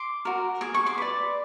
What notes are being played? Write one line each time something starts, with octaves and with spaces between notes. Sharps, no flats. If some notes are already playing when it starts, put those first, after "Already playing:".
Already playing: C6 D6
F#4 A#4
G#4 D6
C#6
C6 D6
B4 D5